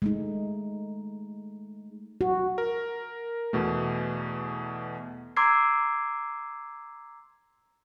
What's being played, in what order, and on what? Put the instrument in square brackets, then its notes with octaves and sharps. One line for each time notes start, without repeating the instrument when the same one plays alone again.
[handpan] G#3 A3 D#4
F#4
[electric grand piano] A#4
E2 B2 A3
[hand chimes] A#5 C6 D6 E6 G#6 C7